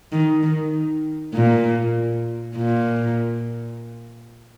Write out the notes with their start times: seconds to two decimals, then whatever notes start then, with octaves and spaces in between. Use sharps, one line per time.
0.12 D#3
0.43 D#3
1.34 A#2
2.56 A#2